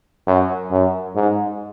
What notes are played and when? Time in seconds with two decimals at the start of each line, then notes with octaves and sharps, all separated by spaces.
0.27 F#2
0.71 F#2
1.15 G#2